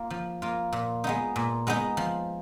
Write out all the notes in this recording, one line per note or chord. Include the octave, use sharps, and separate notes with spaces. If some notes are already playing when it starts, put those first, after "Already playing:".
Already playing: A#3 F4
F3
A#3 F4
A#2
G#3 B3 D#4
A#2
G#3 B3 D#4
F3